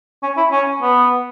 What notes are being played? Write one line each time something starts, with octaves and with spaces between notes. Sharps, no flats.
C#4
E4
C#4
B3